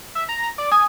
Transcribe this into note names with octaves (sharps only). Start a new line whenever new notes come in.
E5
A#5
D5
G#5 D#6